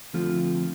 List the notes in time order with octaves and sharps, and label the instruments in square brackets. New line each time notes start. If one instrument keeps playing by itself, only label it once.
[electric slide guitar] D3 F3 A3 C4 F4